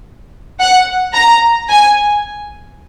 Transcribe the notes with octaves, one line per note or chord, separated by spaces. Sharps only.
F#5
A#5
G#5